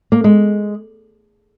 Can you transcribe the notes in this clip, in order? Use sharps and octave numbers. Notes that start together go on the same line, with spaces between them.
A#3
G#3